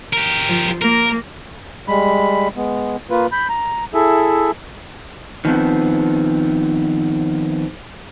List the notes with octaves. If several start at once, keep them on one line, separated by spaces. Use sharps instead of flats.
G4 A#4
F3
A#3 A#4
G3 G#3 B5
G#3 B3
A#3 F4 B4
B5 G6
A#5
E4 G#4 A4 E5
D#3 F3 B3 C4